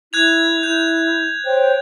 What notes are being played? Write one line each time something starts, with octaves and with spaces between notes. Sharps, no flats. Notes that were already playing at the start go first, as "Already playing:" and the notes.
E4 F#6 G#6 F7
E4 G6
C5 C#5 G5